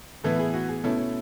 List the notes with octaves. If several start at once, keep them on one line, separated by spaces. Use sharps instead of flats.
A2 E3 B3 E4 A4
G#4
F#4
G#4
B2 A3 C#4 E4 A4